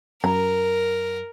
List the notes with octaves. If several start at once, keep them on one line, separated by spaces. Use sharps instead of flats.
F#2 A#4 A#5